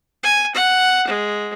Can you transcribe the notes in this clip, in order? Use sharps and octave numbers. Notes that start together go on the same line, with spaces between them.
G#5
F#5
G#3